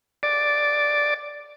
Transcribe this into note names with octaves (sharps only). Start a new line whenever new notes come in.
D5